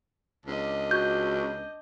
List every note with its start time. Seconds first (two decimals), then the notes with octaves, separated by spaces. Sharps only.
0.46 C#2 D4 D#5
0.91 F#4 G6